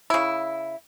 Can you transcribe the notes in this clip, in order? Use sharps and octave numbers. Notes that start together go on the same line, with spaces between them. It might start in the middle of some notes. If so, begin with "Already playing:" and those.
C#3 E4